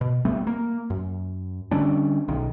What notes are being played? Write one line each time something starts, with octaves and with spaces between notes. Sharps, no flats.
B2
G3 A3 B3 C4
A#3
F#2
D3 G3 C#4 D4
B1 D#3